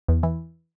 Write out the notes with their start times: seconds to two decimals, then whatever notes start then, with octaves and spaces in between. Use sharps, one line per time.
0.08 E2
0.23 E3